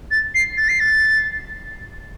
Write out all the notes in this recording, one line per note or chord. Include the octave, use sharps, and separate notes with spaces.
A6
C7
A6
C7
A6